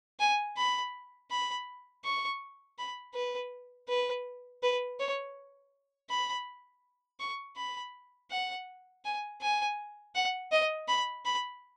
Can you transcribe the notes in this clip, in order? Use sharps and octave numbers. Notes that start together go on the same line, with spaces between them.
G#5
B5
B5
C#6
B5
B4
B4
B4
C#5
B5
C#6
B5
F#5
G#5
G#5
F#5
D#5
B5
B5